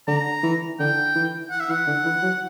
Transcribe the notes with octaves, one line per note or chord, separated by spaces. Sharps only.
D3 A#5
E3
D3 G5
E3
F#5
E5
E3 F#5
D3
E3
F#3